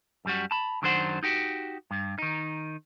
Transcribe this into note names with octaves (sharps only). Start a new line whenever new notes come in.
F#2 G3 F#4
A5 B5
F#2 D#3 F#3 D4 C5 F#5
D#4 F#4 G4
G2
D#3 D#4